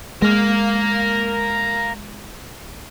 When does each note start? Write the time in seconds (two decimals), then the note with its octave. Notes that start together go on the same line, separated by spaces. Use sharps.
0.22 G#3 A#4 F5